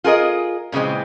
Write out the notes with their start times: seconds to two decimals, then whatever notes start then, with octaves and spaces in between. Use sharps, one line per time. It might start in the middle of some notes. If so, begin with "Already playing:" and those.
0.04 F4 G#4 A#4 D#5
0.72 A#2 C#3 E3 G#3 C4